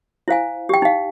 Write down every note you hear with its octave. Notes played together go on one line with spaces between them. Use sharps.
E4 C5 F5 G#5
G4 G5
D#4 F5